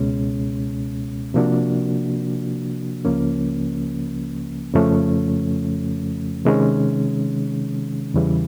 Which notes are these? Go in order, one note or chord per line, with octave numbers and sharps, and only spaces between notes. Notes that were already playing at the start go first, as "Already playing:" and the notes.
Already playing: C#2 B2 G#3 C#4
C3 F3 A#3 D4 F#4
C#2 C#3 F3 A#3 C#4
F2 C#3 F3 A3 C#4
C3 D#3 G#3 C#4
E2 C#3 E3 G3